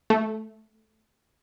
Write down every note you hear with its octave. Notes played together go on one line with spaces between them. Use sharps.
A3